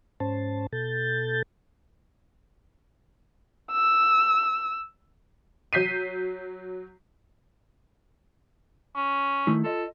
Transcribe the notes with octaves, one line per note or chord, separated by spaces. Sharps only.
G#2 C#4 C5 A5
B2 A4 G6 A6
E6
F#3 G6 B6 C7 D#7
C#4
D#3 A3 E4
F4 A4 D#5